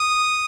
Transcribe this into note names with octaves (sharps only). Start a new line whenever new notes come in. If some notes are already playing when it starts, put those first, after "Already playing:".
Already playing: D#6